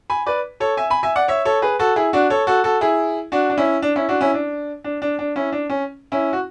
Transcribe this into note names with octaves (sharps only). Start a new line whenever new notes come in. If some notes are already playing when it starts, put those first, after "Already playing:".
G#5 B5
B4 D5
A4 C#5
E5 G#5
G#5 B5
E5 G#5
D5 F#5
C#5 E5
A4 C#5
G#4 B4
F#4 A4
E4 G#4
D4 F#4
A4 C#5
F#4 A4
F#4 A4
E4 G#4
D4 F#4
D4
C#4 E4
D4
C#4 E4
D4 F#4
C#4 E4
D4
D4
D4
D4
C#4 E4
D4
C#4
C#4 E4
F#4